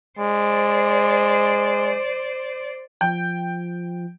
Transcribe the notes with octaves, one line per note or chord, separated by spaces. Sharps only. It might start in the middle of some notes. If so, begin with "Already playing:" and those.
G#3 C5 D5
F3 G5